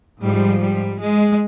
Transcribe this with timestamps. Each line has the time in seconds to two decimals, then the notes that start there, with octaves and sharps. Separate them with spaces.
0.20 G#2 F3 G3
0.60 G3
0.99 G#3